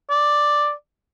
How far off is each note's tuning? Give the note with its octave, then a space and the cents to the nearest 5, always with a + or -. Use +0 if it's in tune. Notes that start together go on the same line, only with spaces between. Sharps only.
D5 +5